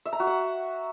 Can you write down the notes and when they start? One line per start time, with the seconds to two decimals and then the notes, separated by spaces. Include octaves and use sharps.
0.05 E5
0.13 A#5
0.20 F#4
0.27 F#5